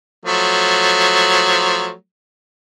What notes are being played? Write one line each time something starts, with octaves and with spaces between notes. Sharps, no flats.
F3 F#3 A3